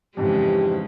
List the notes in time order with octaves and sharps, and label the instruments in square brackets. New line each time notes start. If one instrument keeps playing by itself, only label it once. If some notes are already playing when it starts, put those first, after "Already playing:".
[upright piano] F2 G#2 E3 [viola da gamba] C#3 G#3 [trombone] G4